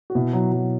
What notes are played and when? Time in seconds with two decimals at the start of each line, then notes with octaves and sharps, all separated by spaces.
0.10 F#4
0.15 B2 E4
0.33 F#3
0.52 F#3